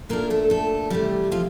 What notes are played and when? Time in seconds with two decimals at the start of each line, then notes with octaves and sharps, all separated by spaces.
0.09 A#2 A3 A#3 D4 A#4
0.30 A3 A4
0.50 A3 A4
0.90 C3 E3 G3 A3 G4
1.31 F3 F4